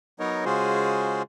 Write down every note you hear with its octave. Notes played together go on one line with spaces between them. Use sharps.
F#3 B3 D#4 A#4 C#5 D#5
C#3 G#3 F4 F#4 G#4 C5